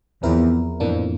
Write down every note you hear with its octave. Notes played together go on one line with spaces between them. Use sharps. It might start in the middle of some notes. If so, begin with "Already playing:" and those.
E2 F3 C4 E4 A#4
F2 A2 E3 A#3 D4